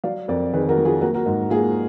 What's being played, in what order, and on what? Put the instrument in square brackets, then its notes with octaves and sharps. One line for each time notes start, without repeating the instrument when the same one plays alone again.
[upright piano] F#3 D5 F5
F2 A#4 D5
D#3 G#4 B4
F#4 A#4
F#3
F4 G#4
A#3 F#4 A#4
F#4 A#4
G#2 F#4
A#3 F4 G#4